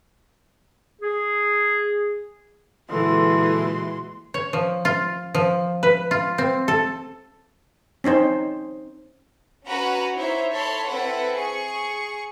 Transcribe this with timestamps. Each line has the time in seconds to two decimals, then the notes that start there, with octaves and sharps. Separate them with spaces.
1.02 G#4
2.90 A#2 D3 E3 G#3 F#4 A4 C6
4.34 C#5
4.53 F3
4.85 F4
5.34 F3
5.83 B4
6.11 F4
6.38 C4
6.68 A4
8.04 C4 C#4 D#4 C5
9.68 C#4 F#4 B4 F#5 A#5
10.18 D#4 E4 C5 C#5 E5
10.52 A4 C#5 A5 B5 C6
10.88 C4 E4 A4 B4 E5 F#5
11.36 G#4 C#6 C#7